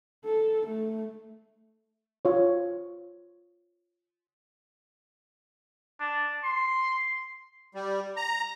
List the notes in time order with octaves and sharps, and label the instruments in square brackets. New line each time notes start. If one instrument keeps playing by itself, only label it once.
[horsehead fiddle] A4
A3
[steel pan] F4 C#5
[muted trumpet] D4
C6
[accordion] G3
A#5